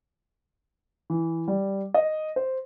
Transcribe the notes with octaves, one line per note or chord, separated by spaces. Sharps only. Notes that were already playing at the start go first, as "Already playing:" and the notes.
E3
G3
D#5
C5